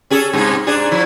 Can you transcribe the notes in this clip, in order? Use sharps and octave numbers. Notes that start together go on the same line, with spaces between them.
C#4 G#4 A4
G2 C3 G#4
G#2 D4 G#4
F3 E4